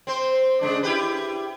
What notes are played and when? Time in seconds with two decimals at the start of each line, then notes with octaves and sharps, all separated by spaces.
0.07 C4 C5
0.61 C#3 G#3 D4
0.83 E4 G4 B4